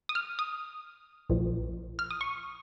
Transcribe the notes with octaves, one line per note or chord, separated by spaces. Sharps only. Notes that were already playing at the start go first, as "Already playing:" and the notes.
D#6
F6
D#6
A#1 A#2 F3
F6
D#6
C#6